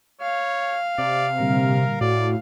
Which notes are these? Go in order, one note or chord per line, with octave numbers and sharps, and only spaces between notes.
C#5 F5
C3 D5
A#2 D3 G3 A#4
A2 F#4 D5